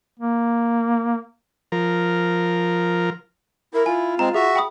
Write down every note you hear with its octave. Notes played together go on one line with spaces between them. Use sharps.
A#3
F3 A#4
E4 A#4
F4 G#5
G#3 C4 A#5
F#4 G#4 E5
G5 B5 D#6